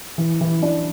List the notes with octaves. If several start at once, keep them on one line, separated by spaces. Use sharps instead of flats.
E3
E3
D4